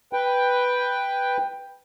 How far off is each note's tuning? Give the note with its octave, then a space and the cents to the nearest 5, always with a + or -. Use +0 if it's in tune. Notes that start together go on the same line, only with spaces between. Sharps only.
B4 +0 G5 +5